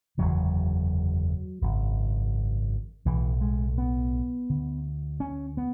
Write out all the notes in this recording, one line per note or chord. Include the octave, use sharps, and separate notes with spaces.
F#1 E2 D3 F#3
G#1 F#2 C#3
B1 A2 E3
G#3
B3
D2 D3
C#4
B3